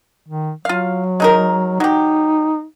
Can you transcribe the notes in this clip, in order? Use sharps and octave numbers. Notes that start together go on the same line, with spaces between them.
D#3
F#3 F4 F5
G#3 D#4 A#4
F#3 D#4 G4